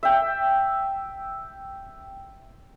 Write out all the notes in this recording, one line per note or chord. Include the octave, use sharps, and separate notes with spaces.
E5 G5